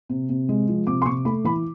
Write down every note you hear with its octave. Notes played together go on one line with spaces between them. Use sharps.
C3
C3
G#3
F3
C3 D6
C6
C3 C#6
A3 B5
E3 B5